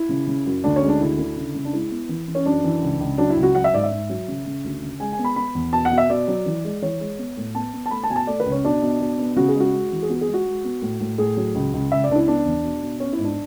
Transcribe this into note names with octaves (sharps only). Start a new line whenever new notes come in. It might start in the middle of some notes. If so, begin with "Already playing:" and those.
Already playing: E4
C#3
C#3
F#2
D2 D4
C#4
G#3
D4
D2 E4
D3
C#3
C#3
D4
G#3 E4
B3
E3
E3
C#4
F#2 D4
E3
C#2
C#2
F#3 D4
E4
C#2
F#4
F#3 F#5
E5
G#2 D5
E5
G#2
F#3
C#3
C#3
D2
C#3
G#3 G#5
G#5
B3
B5
B3 B5
E2
B2 A5
F#5
B2
E5
B2 D5
F#3
E3
G#3
E3 C#5
G#3
B3
A2
B3 A5
B3
A5
A3 B5
A5
B2 G#5
A5
A3 D5
B4
C#2
C#4
B2 D4
B2
B2
B3
C#3 F#4
G#4
G#3 F#4
G#3
E3
G#4
B3 F#4
G#4
G#3
F#4
G#3
B3
A2
A2
A2 G#4
F#3
C#2
C#2
C#2 E5
D5
C#2 D4
E4
B3 D4
E2
B2
B2
B3 C#4
E4
G#2
D4